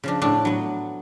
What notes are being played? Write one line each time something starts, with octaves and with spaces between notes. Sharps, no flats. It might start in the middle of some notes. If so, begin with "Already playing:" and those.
C#3 F3 D4
A2 A3 D4
F#3 B3